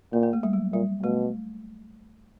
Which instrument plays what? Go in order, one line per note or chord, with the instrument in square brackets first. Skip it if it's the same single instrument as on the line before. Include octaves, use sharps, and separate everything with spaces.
[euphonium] A#2 [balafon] A#3
[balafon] A#3
A3
G3
F#3
[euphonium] A#2 [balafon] G3
[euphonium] B2 [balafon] A3